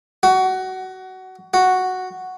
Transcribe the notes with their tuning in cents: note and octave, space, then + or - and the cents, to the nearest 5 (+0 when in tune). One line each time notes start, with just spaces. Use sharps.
F#4 +20
F#4 +0